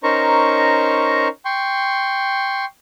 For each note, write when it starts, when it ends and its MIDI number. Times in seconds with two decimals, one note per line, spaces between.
0.03 1.28 61
0.03 1.28 63
0.03 1.28 70
0.03 1.28 72
0.03 1.28 82
0.03 1.28 85
1.45 2.65 79
1.45 2.65 84
1.45 2.65 85